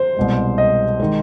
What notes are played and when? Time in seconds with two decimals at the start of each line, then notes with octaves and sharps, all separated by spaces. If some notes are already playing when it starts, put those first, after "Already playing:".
Already playing: C5
0.17 C2 B2 G#3
0.58 D#5
1.00 D#3 G#3